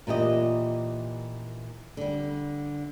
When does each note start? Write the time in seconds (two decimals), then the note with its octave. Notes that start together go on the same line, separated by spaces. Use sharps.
0.07 A#2 E3 G4 D#5
1.97 D3 G3